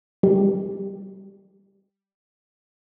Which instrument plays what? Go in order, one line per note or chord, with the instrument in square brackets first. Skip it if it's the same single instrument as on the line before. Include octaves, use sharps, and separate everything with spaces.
[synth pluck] G3 G4